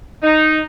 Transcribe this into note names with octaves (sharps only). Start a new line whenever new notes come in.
D#4